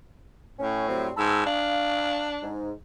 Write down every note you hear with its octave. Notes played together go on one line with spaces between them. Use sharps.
A2 C#4
F#3 G3 C4
G#2 A5 B5 E6
D4 F5
G#2